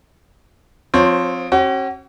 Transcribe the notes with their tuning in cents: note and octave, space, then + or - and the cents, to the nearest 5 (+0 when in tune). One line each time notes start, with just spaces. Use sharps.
F3 +20 C4 +0 C#5 +0
C#4 -40 F#4 +40